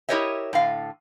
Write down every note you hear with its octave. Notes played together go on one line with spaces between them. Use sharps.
E4 G4 A#4 C#5 D#5 E5
A2 D3 F5